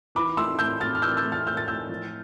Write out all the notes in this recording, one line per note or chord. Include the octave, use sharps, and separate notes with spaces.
E3 B5 D6
A3 C6 E6
A2 E6 G6
A2 F6 A6
F6
E3 E6 G6
E6 G6
A3
F6 A6
A2 E6 G6
A6
A2 E6 G6
F3